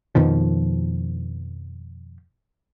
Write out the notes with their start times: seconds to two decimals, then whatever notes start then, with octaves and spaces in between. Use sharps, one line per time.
0.15 F2 B2 D#3 F3